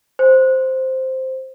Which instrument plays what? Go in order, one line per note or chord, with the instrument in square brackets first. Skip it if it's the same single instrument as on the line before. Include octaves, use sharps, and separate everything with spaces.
[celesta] C5